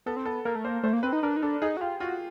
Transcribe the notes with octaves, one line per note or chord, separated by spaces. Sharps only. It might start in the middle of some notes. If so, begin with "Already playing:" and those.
B3 A4
C4
B3 A4
A#3 A#4
A3
A#3 C5
A3 C5
A#3
C4 B4
D#4
D4 A#4
D#4
D4 A4
D#4 G#4
F#4
F4 G4
F4 F#4